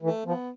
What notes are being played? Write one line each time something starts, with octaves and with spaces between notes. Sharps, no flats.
E3 A3
F3 B3